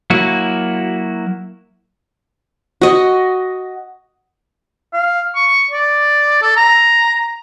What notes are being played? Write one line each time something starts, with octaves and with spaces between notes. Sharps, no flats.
F#3 A#3 E4 F#4
F#4 D#5
F5
C#6
D5
A4
A#5